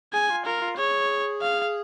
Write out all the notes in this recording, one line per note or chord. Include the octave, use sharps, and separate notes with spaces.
G#4 G#5
F4
F4 A#4
F4
G#4 C#5
F5